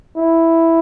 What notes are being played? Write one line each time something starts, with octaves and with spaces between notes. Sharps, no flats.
E4